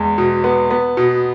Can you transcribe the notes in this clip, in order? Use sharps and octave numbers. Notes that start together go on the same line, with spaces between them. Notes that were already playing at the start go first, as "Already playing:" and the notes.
Already playing: E2 G#3
B2
B3
B3
B2